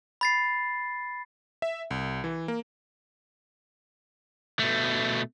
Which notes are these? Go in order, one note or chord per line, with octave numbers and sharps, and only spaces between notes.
B5 A6 C7
E5
C2
E3
A#3
B2 A3